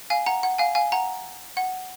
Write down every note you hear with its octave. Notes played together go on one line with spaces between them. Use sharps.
F5 G#5
F#5 A#5
F#5
F5 G#5
F5 G#5
F#5 A#5
F#5